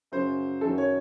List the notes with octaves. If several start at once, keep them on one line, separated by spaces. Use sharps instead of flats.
F#2 C#3 F#3 C5
F#2 D#3 F#3 A4
C#5